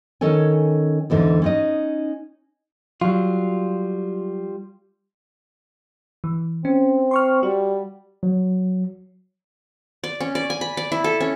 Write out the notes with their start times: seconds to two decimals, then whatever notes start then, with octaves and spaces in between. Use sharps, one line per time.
0.21 D#3 C#4 A4 C#5 G#5
1.10 E2 G#2 D3 E3
1.42 C#4 D#4 D#5
3.02 F#3 G3 F4
6.24 E3
6.65 C4 C#4
7.11 C6 C#6 F6
7.43 G3 F#4
8.23 F#3
10.04 D5
10.20 C#4
10.35 D5
10.50 G#5
10.61 B5
10.77 D5
10.92 E4
11.04 A4
11.20 C#4